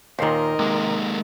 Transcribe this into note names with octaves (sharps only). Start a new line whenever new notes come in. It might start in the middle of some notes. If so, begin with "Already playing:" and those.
D#2 A#2 D#3 A#4 C5 D#5
C3 G#3 A#3